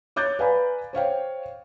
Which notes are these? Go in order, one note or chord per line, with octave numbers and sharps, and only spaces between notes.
C#5 D6 F#6 G6 A6
B4 D5 F5 G#5 A#5 B5
C5 C#5 F5 G5